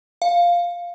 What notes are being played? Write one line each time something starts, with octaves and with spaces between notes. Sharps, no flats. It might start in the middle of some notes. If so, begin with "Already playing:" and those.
F5